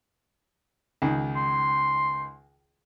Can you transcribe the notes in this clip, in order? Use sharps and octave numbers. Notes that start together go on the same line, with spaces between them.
C#2 D#3
C6